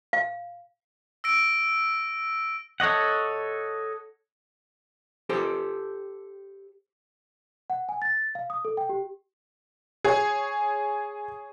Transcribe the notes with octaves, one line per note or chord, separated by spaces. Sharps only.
F5
E6 A#6 D7
A4 C#5 D#5 F#5
G4 A4 C5
F#5
G#5
A6
F5
D#6
A4
G5
G4
G#4 C#5 G#5